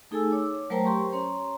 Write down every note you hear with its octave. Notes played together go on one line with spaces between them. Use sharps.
A3 D#4 G#4 A4 G#5 E6
C#5 D6
F#3 A3 A#4 C5 G5 A#5
G4 C5 C6 C#6
C#4 C#5 A#5 C6